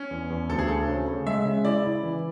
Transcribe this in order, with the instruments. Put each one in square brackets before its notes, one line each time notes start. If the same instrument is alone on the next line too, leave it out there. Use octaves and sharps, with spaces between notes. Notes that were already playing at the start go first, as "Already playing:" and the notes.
Already playing: [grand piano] C#4
[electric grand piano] E2
E2
[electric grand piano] D2 [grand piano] A4
[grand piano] G#4
[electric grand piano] D2 [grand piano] A4
[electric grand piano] C#3
C#3
[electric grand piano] G#3 [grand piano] E5
[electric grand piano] C#3
[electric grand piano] E4 [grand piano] D5
[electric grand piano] E4
E3